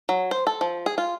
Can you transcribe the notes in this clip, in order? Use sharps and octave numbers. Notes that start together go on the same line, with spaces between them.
F#3
C5
A4
F3
G#4
F4